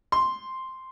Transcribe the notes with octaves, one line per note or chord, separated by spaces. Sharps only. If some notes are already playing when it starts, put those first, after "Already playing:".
C6